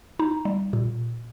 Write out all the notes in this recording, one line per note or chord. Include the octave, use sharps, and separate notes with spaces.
D#4
G3
A#2